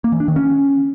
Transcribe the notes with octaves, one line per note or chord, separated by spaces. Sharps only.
A#3
E3
D4
D#3
C#4